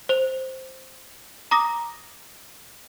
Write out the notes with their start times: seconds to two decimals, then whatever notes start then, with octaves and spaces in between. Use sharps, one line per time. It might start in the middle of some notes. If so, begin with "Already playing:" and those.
0.09 C5 F7
1.51 A#5 D6 D#6 A#6